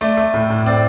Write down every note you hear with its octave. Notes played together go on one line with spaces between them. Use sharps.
A3 D5
A3
A2
A2
C4 D5